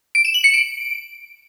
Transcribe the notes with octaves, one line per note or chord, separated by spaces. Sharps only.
D7
E7
F#7
C#7
D7